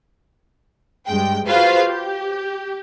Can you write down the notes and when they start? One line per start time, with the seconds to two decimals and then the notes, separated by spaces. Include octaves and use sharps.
1.07 G2 G#3 G5
1.47 F4 F#4 G#4 B4 C5 F5
1.85 G4